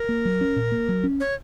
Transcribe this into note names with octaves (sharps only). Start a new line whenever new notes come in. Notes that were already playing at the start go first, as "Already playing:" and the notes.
Already playing: A#4
A#3
F#3
C#4
A#2
A#3
F#3
C#4
C#5